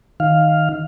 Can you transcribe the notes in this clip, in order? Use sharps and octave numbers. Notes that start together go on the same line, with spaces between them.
D#3 F5